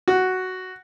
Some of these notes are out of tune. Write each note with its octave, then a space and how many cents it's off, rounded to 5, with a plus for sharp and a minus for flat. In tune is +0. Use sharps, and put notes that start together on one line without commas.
F#4 +5